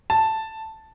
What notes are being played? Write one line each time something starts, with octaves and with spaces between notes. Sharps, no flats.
A5